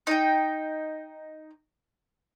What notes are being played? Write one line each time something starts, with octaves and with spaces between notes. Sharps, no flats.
D#4 G5